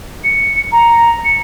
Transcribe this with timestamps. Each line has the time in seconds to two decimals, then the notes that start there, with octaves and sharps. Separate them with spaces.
0.23 C#7
0.71 A#5
1.24 C#7